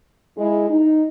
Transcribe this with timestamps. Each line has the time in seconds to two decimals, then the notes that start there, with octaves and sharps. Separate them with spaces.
0.38 G#3 E4
0.69 D#4